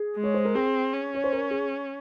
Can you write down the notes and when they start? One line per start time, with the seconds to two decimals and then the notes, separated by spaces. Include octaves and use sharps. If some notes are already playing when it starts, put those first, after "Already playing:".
Already playing: G#4
0.16 G#3
0.24 C#5
0.34 C5
0.45 A#4
0.55 C4 G#4
0.93 C#4
1.15 C#5
1.24 C5
1.33 A#4
1.51 G#4